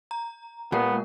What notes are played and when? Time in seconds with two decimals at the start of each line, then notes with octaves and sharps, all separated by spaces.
0.11 A#5
0.72 A#2 G#3 A#3 B3 A#4